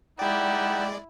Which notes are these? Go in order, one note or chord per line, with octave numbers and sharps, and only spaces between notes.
G3 G#3 D#4 E4 D5 F#5 G5